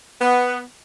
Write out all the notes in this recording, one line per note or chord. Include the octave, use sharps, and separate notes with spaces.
B3